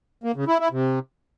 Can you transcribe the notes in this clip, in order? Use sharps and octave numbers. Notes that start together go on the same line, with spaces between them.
A#3
C#3
E4
E4
C3